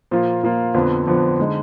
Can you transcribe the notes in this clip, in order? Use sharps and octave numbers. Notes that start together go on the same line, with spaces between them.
A#2 F3 A#3 F4
A#2 F3 A#3 F4
F2 D3 F3 B3
F2 D3 F3 B3
D3 G#3 D#4